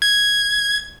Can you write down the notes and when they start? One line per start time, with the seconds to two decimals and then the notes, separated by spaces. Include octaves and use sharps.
0.02 G#6